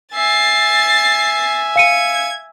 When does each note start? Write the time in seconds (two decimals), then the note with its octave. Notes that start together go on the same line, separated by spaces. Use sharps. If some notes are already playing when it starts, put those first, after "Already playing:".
0.14 E5 G#5 A6 C7
1.76 F5 G#6 C#7 D#7